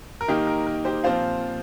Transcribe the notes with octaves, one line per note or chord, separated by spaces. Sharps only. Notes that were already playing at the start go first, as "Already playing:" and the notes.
A#4
D#3 A#3 D#4 G4
A#4
A#4
G4 C5
A#2 F3 C4 F4 C5 F5